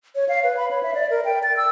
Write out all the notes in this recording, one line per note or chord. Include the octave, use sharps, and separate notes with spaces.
C#5
F5
B4
B5
C#5
E5
D5
A#4
G5
A6
E6